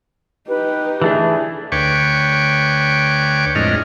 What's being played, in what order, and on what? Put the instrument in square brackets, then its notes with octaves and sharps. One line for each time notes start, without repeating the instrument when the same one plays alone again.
[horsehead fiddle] D#4 G4 [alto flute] B4
[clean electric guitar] E3 A3 D4 [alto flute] G#4
[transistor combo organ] D2 B4 C#5 G5 C#6 D6
F2 A2 G#3 D4 D#5 F6